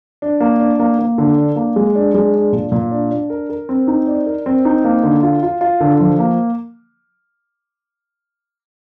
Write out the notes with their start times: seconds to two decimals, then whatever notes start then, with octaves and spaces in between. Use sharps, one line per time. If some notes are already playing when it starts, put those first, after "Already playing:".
0.22 D4
0.40 A#3
0.60 D4
0.79 A#3
0.99 A#3
1.18 D3
1.38 D4
1.56 A#3
1.76 G#3
1.95 D4
2.14 G#3
2.34 D4
2.52 A#2
2.72 A#2
2.91 D4
3.11 D4
3.30 A#4
3.50 A#4
3.69 C4
3.87 D#4
4.07 D5
4.26 A#4
4.46 C4
4.65 D#4
4.84 A#3
5.03 D3
5.23 F4
5.43 F4
5.61 F4
5.80 D3
6.00 F3
6.19 A#3